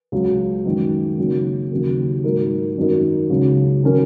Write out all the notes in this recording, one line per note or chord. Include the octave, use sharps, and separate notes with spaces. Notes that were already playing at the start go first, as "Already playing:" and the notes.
C#2 C#3 F#3
F#2 D#3 G#3 D#4
C#3 F#3 A#3
D#2 C#3 F#3 A#3
G#2 F#3 D#4 A#4
G#1 F#2 F#3 D#4 A#4
C#2 C#3 F#3
D#3 F#3 C#4 A#4